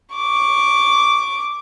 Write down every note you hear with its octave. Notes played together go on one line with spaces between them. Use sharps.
C#6 D6